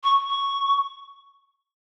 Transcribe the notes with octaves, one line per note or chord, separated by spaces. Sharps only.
C#6
C#6